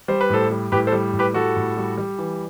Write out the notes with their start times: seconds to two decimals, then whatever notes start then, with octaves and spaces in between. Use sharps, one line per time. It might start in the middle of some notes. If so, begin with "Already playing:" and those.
0.08 G3 C5
0.21 B4
0.30 A2 A4 C5
0.50 G3
0.72 A2 G4 B4
0.87 A4 C5
0.92 G3
1.13 A2
1.19 G4 B4
1.34 G3 F#4 A4
1.56 A2
1.77 G3
1.98 G3
2.18 E3